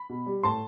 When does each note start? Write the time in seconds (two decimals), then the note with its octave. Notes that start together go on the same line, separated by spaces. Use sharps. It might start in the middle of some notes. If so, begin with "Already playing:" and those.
Already playing: B5
0.09 B2
0.26 G3
0.43 A2 A5 C6